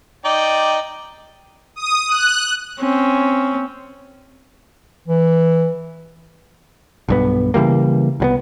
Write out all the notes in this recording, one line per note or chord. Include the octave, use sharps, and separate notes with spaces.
D#4 D5 G5
D#6
F#6
C4 C#4
E3
B1 G2 B3
C#3 E3 G3 A#3
C2 F#3 B3